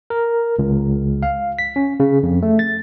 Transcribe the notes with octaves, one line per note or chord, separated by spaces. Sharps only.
A#4
C#2
F5
B6
C#4
C#3
F2
A3
A6